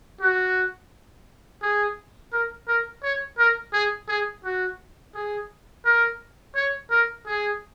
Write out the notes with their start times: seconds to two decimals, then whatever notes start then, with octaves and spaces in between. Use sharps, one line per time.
0.21 F#4
1.62 G#4
2.32 A#4
2.68 A#4
3.03 C#5
3.38 A#4
3.73 G#4
4.08 G#4
4.44 F#4
5.14 G#4
5.85 A#4
6.56 C#5
6.90 A#4
7.26 G#4